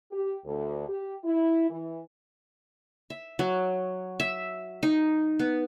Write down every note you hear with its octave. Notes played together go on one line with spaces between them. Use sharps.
G4
D2
G4
E4
E3
E5
F#3
E5
D#4
B3